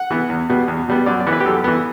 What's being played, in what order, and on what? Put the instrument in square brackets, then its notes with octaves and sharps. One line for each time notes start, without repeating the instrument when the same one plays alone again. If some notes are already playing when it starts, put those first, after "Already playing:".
Already playing: [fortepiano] F#5
E3 B3
E2
B2 G3 B3
E2
B2 G3 B3
F#2 D5
D5
E3 B3
B4
G4
F#2 A4
E3 B3